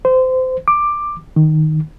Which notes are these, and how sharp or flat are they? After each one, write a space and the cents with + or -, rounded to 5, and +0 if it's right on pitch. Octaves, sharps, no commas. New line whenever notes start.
C5 -25
D6 +10
D#3 -5